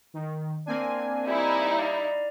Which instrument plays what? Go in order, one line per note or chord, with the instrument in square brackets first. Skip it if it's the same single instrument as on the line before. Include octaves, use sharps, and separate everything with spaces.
[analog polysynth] D#3
[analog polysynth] A#3 C4 G#5 [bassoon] D4
[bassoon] G3 [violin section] D#4 E4
[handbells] D5 F5 A#5